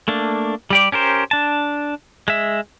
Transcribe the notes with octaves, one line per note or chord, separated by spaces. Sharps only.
A3 A#3 D4
G3 G4 D5
C#4 G4 A#4 C5
D4 A5
G#3 E5